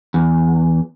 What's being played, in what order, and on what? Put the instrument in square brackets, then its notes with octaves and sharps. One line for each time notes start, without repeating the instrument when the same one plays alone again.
[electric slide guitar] E2